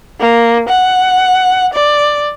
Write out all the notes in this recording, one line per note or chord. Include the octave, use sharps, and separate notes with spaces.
A#3
F#5
D5